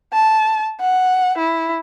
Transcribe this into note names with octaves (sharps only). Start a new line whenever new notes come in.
A5
F#5
E4